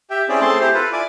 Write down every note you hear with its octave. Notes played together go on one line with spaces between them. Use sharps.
G4 E5 G5
C4 C#4 E4 G#4 D5
A3 C4 G#4 A5 C6
C4 E4 G4 C5
F4 A4 B4
E4 D5 G#5 D6